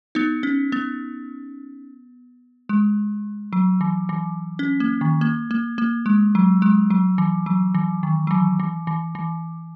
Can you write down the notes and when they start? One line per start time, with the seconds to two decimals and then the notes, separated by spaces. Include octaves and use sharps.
0.15 B3 D#4
0.43 C#4
0.72 B3
2.69 G#3
3.53 F#3
3.81 E3
4.09 E3
4.59 C#4
4.80 A#3
5.01 D#3
5.21 A#3
5.51 A#3
5.78 A#3
6.06 G#3
6.35 F#3
6.62 G#3
6.90 F#3
7.18 E3
7.46 F#3
7.75 E3
8.03 D#3
8.27 F#3
8.31 E3
8.60 E3
8.87 E3
9.15 E3